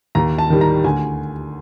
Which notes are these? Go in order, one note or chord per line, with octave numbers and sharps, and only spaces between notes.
D#2 A#5
A5
D#3 G3
A#5
D2 G#5